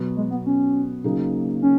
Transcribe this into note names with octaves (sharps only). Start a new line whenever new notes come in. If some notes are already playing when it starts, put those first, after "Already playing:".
Already playing: B2 F#3 B3 F#4
G#3
B3
C#4
C#3 F#3 A#3 D#4
C#4